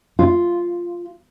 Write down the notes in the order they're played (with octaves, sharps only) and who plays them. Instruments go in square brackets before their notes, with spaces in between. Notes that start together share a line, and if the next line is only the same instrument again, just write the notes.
[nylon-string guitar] F4